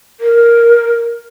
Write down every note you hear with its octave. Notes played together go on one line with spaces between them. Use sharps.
A#4